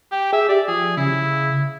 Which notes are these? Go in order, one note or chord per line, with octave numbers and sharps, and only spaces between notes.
G4 G5
G#4 E5
G4 D5
F3 G#4
C#3 E4